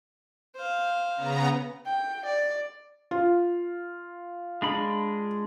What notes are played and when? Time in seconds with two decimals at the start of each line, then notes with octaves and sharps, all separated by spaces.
0.55 C5 F5
1.17 C#3 B3 A#5
1.86 G5
2.26 D5
3.11 F4
4.62 G#3 D4 B5